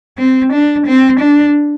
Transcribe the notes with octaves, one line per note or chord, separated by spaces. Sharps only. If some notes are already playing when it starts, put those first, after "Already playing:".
C4
D4
C4
D4